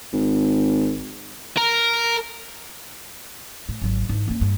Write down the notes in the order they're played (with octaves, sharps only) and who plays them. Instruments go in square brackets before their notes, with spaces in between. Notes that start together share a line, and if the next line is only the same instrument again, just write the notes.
[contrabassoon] G#1
[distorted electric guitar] A#4
[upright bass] A2
G#1 F#3
G#2 E3
A#3 C#4
G2